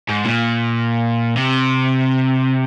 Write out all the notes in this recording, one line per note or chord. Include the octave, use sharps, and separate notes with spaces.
G#2
A#2
C3